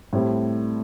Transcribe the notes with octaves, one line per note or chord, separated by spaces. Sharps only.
A2 G3 C4